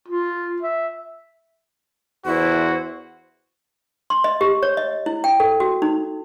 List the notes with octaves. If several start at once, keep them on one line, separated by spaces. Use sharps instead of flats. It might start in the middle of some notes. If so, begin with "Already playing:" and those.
F4
E5
E2 E4 F#4 C5
C6
D#5
G4
C#5
D#5
E4
G5
A4
F#4
D#4